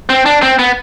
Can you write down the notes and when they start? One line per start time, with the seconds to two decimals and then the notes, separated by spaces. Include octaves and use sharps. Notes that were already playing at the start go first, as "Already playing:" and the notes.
0.10 C4
0.26 D4
0.42 C4
0.59 B3